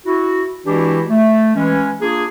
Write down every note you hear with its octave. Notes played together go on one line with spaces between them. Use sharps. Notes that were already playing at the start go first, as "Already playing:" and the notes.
E4 F#4
E3 G#3 D4 E4 F#4 G4
A3
E3 G#3 C#4
A#3 D4 F4 G#4